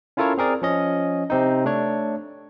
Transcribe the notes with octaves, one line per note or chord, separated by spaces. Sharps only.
C#4 E4 F4 A4 A#4 C#5
C4 G#4 A#4 D5
F3 C#4 D#5
C3 C4 D#4
A3 D4 C#5